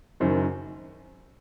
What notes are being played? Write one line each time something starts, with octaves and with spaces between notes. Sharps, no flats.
F#1 F#2 D#3 C5